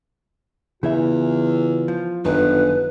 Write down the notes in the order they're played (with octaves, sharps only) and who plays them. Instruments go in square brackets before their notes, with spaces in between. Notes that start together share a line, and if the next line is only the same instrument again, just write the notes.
[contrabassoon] E2 [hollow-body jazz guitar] C#3 E3 E5 [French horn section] F4
[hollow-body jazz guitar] F3
[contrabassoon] G1 [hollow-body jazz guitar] F#2 D#3 G3 [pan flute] B4